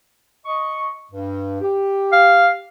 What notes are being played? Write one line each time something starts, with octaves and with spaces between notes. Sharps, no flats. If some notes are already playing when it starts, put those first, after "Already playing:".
D#5 C#6
G2
G4
F5